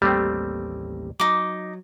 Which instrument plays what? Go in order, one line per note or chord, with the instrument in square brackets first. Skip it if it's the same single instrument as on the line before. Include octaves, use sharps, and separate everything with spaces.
[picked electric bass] A1 D#2 A#3 [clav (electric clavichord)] G3 A3 C4 [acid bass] G4
[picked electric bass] F#3 [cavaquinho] D#4 D6